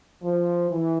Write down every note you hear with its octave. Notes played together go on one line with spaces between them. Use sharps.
F3
E3